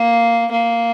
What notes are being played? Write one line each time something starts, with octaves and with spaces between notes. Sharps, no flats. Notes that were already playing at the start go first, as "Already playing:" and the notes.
Already playing: A#3
A#3